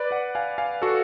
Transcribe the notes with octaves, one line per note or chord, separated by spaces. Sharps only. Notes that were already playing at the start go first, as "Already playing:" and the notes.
Already playing: B4 D5
D5 F#5
F5 G#5
F5 G#5
F#4 A4